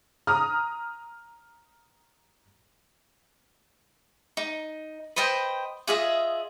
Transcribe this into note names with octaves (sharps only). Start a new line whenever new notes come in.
A#5 D#6 F6
D#4
B4 C5 D#5 G5
F4 G#4 D#5 E5